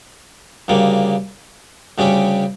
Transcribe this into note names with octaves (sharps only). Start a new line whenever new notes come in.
D2 C#3 G3 A#3
D2 C#3 G3 C#4 G4